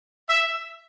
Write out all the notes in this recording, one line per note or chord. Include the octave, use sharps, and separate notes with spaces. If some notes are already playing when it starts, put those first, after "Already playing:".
E5